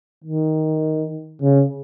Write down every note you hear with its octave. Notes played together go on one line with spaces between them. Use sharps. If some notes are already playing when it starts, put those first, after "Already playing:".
D#3
C#3